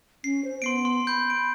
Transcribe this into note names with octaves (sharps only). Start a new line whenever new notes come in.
C#4 C7
C5
B3 C6 C7 D7
C6
B5 G6
D7